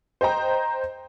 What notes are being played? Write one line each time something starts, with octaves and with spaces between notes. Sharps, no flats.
C5 D#5 G5 A#5